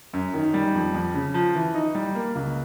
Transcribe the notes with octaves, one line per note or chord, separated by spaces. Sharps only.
F#2
D#3
G3
F2
F2
C#3
F3
E3
D#4
G3
A#3
C#2